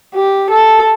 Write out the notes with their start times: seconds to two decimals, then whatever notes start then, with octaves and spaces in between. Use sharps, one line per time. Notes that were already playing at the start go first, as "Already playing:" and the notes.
0.15 G4
0.50 A4